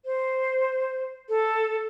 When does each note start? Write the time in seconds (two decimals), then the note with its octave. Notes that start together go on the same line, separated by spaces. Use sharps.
0.05 C5
1.29 A4